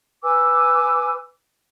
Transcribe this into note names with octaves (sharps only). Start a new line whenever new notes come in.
B4 G#5 D6 E6